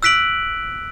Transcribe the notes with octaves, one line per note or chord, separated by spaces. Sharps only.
E6 F#6 B6 D7 F#7